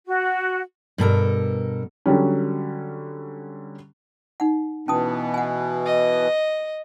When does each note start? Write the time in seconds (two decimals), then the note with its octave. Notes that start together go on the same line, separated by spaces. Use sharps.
0.06 F#4
0.98 G2 B2 A4 A#4
2.06 D3 F#3 G3 C#4
4.40 D#4 F#5
4.88 B2 E3 B3 C#4 A5 D#6
5.34 F#5 G#5
5.85 D#5